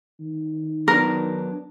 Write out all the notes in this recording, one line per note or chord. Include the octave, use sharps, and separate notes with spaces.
D#3
F#3 B3 D4 A#4